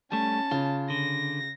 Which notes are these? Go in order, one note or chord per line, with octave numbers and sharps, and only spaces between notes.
G3 A3 C#4 A5
C#3 F4
D3 A#6